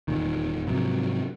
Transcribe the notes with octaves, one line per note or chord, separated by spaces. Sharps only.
D#1 E2 A#2 D#3
G#2 C3 F3 F#3